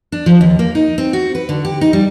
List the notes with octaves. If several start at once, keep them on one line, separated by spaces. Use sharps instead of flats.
D4
F3
D#2
A#3
D#4
C4
F#4
B4
D3
G4
D#4
G3